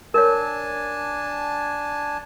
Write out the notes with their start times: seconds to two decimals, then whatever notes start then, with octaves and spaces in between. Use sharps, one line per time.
0.14 D4 A#4 C#5 G#5 A5